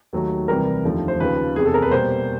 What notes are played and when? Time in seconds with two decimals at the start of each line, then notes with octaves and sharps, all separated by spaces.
0.13 D#2 D#3 F#3 A3
0.48 C2 C3 E3 G3 A#4
0.84 F1 D#2 D3 F3 A3
1.08 C5
1.20 D#2 C#3 F3 B4
1.56 F1 E2 C3 G#4
1.65 A4
1.74 A#4
1.82 B4
1.91 B2 G3 A#3 C5